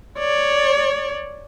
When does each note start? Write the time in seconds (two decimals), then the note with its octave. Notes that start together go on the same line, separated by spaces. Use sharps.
0.19 C#5 D5